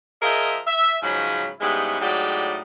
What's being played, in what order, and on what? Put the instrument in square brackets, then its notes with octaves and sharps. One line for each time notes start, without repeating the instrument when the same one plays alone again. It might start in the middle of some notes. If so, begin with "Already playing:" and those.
[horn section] F3 F4 G#4 A#4 D#5 E5
E5
G#2 C#3 F3 F#3 G#3 B5
G#2 G3 G#3 B3 C#4 E4
A2 F#3 G#3 D#4 G4 D5